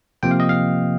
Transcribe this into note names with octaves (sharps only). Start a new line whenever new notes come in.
C3 F3 A#3 G5
F5
D#5
F5